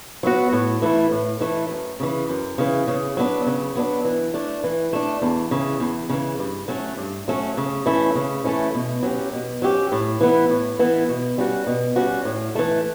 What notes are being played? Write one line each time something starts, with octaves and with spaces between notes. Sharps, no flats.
F#3 B3 F#4
A2
E3 A3 E4
A2
E3 A3 E4
F#2
C#3 E3
F#2
C#3 E3
C#3
F#3 B3 D4
C#3
F#3 B3 D4
E3
A3 D4
E3
A3 D4
E2
C#3 E3
E2
C#3 E3
G2
F#3 A3 C#4
G2
F#3 A3 C#4
C#3
E3 A3 C#4 E4
C#3
E3 A3 C#4 E4
B2
F#3 C#4 G4
B2
F#3 C#4 G4
A2
E3 B3 E4
A2
E3 B3 E4
B2
G3 C#4 F#4
B2
G3 C#4 F#4
A2
E3 A3